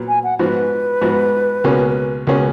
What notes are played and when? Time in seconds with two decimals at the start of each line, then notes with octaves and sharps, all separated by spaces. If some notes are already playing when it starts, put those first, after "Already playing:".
Already playing: A#2 F#3 B3
0.08 G#5
0.24 F#5
0.39 G#2 F3 B3 F#4 B4
1.02 G#2 F3 B3 F#4
1.64 C#2 B2 A#3 C#4 G#4
2.27 C#2 B2 A#3 C#4 G#4